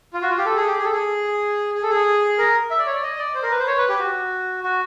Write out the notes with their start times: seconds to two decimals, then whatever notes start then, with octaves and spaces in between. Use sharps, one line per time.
0.14 F4
0.22 F#4
0.30 F4
0.38 G4
0.46 A4
0.56 G#4
0.67 G4
0.78 G#4
0.84 A4
0.92 G#4
1.74 G#4
1.83 A4
1.90 G#4
2.38 A#4
2.71 E5
2.79 D5
2.86 C#5
2.94 D5
3.03 D#5
3.18 D5
3.35 C5
3.43 A#4
3.51 B4
3.59 C5
3.67 C#5
3.77 B4
3.89 G4
3.99 F#4
4.63 F#4